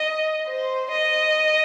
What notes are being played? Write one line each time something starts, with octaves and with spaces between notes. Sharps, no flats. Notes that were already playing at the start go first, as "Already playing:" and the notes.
Already playing: D#5
C5
D#5